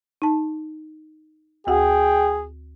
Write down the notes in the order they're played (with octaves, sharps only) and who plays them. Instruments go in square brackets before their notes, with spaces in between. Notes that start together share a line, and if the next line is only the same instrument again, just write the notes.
[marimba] D#4 A5
[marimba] D2 F#4 F#5 [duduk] G#4 [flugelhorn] G5